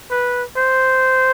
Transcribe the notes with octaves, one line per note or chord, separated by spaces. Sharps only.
B4
C5